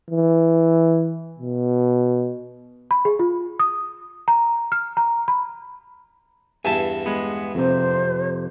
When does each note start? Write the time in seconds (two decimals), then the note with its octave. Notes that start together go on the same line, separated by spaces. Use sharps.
0.10 E3
1.39 B2
2.91 B5
3.05 G#4
3.19 F4
3.59 D#6
4.28 A#5
4.72 F6
4.97 A#5
5.28 B5
6.65 E2 G2 E5 G#5 A5
7.06 G#3 B3
7.55 F2 C3 C5